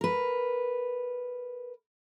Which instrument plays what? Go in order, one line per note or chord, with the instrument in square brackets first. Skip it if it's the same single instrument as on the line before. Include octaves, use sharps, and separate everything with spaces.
[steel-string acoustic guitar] A#4 B4